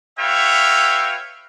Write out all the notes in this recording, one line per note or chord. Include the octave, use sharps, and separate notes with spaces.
F#4 B4 C#5 E5 F5 G5